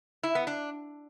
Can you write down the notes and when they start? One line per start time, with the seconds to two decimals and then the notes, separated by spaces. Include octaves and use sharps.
0.23 E4
0.35 B3
0.47 D4